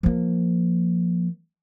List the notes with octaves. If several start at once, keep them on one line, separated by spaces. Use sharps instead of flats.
F3 A#3